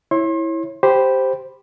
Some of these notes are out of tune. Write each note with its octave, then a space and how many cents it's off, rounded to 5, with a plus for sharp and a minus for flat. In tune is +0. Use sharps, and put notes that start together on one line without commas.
E4 -5 C#5 -20 C6 +35
G4 +0 C5 +0 B5 +0